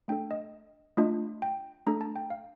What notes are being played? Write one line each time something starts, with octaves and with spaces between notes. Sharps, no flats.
A3 D4 A4 G5
D#5
A3 D4 F4 D#5
G5
A3 D4 A4 A#5
A5
G5
F5